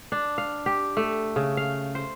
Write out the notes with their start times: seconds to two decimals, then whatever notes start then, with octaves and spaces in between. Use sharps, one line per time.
0.12 D4
0.38 F5
0.66 G4
0.97 A3
1.36 C#3
1.57 F5
1.95 C5